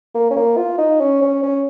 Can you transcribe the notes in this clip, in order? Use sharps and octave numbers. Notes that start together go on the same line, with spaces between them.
A#3
C#4
A#3
F4
D#4
C#4
C#4
C#4